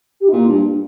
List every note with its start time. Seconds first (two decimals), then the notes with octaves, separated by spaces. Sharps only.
0.21 G4
0.29 D#4
0.32 A#2 F4
0.49 G2